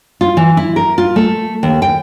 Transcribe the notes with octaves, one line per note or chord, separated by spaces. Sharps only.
F4
E3
E4
A#4
F4
A3
D#2
G5